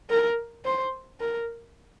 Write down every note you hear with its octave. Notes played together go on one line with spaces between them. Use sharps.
A#4
C5
A#4